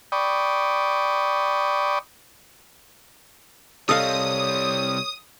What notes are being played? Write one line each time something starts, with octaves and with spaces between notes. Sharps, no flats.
D5 G5 B5 C#6 D#6
C3 G3 A4 C#5 D#5 F5 D#6